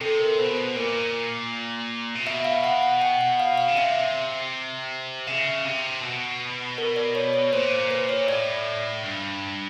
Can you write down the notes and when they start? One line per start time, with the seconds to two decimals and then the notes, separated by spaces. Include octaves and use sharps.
0.01 C3 A4
0.20 A#4
0.38 B2 C5
0.57 B4
0.76 A#2 A#4
2.15 C3
2.27 B2 E5
2.44 F5
2.64 F#5
2.83 F#5
3.01 G5
3.21 F#5
3.40 F5
3.58 F5
3.68 C#3
3.77 C3 E5
5.27 C#3 E5
5.65 C3
6.02 B2
6.78 A#4
6.96 D5
7.15 C#5
7.33 C#5
7.53 A#2 C5
7.71 C5
7.91 B4
8.09 C#5
8.27 A2 D5
9.03 G2